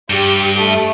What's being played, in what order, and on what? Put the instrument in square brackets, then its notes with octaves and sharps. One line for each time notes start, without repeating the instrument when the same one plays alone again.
[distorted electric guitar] G2 [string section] G4
[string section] A3